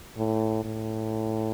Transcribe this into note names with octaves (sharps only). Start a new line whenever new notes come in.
A2
A2